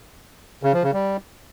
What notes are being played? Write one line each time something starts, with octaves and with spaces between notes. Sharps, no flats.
C#3
F3
C#3
G3